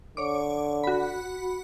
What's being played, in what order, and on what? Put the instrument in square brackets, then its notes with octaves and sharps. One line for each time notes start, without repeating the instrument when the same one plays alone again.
[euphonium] D3 [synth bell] C#5 D6
[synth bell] F#4 B5